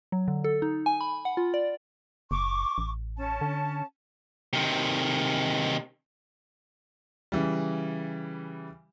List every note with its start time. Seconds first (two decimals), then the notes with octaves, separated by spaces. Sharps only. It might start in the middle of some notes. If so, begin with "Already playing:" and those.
0.12 F#3
0.28 D3
0.44 A4
0.62 D#4
0.86 G#5
1.01 B5
1.25 F#5
1.37 F4
1.54 D5
2.31 F#1 C#6 D6
2.78 A1
3.17 C#4 A5
3.41 D3
4.53 C3 D#3
7.32 C#3 E3 G3